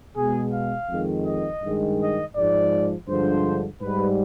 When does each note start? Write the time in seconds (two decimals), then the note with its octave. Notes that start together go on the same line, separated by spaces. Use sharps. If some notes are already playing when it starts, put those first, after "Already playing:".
0.17 B2 G#3 G#4
0.54 F5
0.90 F2 D#3 G#3
1.26 D#5
1.62 G2 D#3 G#3
2.00 D#5
2.36 G#2 F3 G#3 D5
3.08 G2 D3 F3 G#3 C5
3.81 G#2 G3 B4